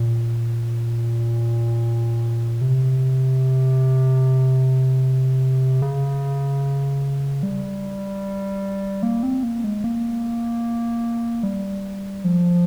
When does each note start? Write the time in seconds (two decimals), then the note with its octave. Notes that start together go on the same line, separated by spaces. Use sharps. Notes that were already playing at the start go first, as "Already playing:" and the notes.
Already playing: A#2
2.61 C3
5.82 C#3
7.43 G3
9.03 A#3
9.23 C4
9.43 A#3
9.64 G#3
9.84 A#3
11.43 G3
12.24 F3